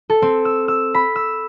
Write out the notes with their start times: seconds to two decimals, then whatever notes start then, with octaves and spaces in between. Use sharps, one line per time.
0.10 A4
0.22 C4
0.45 E6
0.68 E6
0.94 B5
1.16 E6